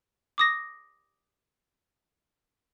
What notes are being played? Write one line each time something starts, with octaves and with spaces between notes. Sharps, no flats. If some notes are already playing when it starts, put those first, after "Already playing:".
D6 D#6 A#6